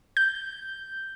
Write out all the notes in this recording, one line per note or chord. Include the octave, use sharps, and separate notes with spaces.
G6